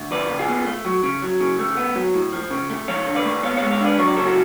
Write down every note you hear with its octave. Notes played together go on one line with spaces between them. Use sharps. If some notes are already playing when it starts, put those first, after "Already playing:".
Already playing: D2
F3 B4 D5
C#3
F4 G#4
B3
A3
F#3
C#3
F#3
C#3
A3
B3
F#3
A2
F3
C#3
A3
F3 C#5 F5
D3
B4 D5
A3
B3 C#5 F5
G#3 C#5 F5
C#5 F5
D4 B4 D5
F#3 C#5
D5
C#3 A4 C#5
F#4 A4